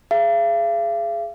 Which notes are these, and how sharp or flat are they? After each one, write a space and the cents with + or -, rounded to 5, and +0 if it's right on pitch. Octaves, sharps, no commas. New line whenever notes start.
G#4 +10 F5 -45